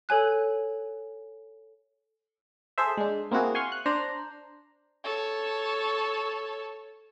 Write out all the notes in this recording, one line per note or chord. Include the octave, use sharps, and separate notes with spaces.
A4 C#5 G#5 F#6
G#4 A4 C5 E5
G#3 D4
A#3 C4 E4 F#4 G#4
G#5 C6 C#6 F6
F#6
D4 C5 A#5
A4 C#5